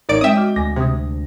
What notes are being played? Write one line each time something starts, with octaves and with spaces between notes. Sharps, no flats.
A1 D#4 A#4 C#5 D5 D7
G#3 C4 D#5 E5 G5 D#6
F#4 D6 F6
D2 G#5 D6 A#6
C3 D#6 G#6